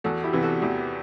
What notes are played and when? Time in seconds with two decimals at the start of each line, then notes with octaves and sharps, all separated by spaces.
0.04 E2 F#4 A4
0.24 E4 G4
0.33 C3 E3 B3
0.43 F#4 A4
0.62 E2 E4 G4